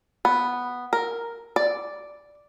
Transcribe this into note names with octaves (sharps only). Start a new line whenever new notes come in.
B3
A#4
D5